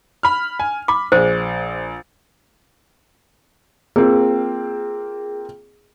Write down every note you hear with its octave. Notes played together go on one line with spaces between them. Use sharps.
B5 F6
G#5
B5 D6
A#1 G#4 C5
A#3 C4 F4 G#4